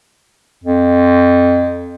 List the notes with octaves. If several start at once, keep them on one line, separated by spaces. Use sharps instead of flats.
F2